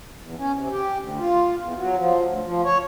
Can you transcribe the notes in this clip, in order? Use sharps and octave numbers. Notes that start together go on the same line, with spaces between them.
E2
C#4
C3
G4
D2
F4
E2
F#3
F3
D2
F3
C#5